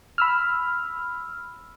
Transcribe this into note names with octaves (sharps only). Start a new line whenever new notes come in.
B5 E6 F6